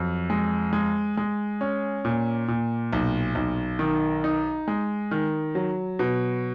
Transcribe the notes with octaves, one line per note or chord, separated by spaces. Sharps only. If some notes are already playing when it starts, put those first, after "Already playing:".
Already playing: F2 F#3
G#3
G#3
G#3
C#4
A#2
A#2
B1
B1
D#3
D#4
G#3
D#3
F#3
B2